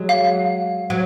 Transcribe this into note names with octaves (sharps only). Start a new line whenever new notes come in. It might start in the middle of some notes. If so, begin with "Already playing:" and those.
Already playing: F#3 G#3
F5
F#3